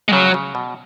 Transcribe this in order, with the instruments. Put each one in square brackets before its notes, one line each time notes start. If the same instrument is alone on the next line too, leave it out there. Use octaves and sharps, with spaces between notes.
[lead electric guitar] G#3
[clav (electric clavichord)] C#3 [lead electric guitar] F#3
[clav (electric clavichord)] C#3
B2